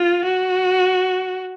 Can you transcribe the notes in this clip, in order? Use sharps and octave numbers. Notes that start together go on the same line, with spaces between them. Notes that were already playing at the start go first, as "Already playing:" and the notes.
Already playing: F4
F#4